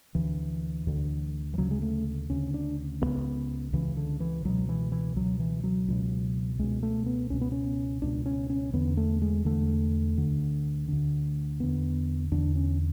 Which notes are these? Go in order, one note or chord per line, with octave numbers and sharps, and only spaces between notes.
D2 D3 E3
D2 D3
E3
D2 C#3 F#3
G#3
A3
D2 C#3 C#4
D4
C#2 C#3 B3
C#2 C#3 E3
D3
E3
C#2 B2 F#3
E3
E3
C#2 B2 F#3
E3
F#3
C#2 B2
C#2 B2 G#3
A3
B3
C#2 B2 C#4
B3
C#4
C#2 B2 D4
C#4
C#4
E2 D3 B3
A3
G#3
E2 D3 A3
D2 D3
D2 D3
E2 D3 B3
E2 D3 D4
C#4